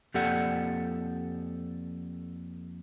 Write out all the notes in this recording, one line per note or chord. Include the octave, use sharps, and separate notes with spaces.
F2 A#3 G4 A4 D5 F#5